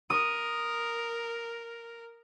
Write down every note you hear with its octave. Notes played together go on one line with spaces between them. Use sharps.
A#4 D#6